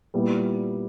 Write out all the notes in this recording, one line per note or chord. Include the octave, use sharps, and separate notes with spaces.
A#2 G3 B3 E4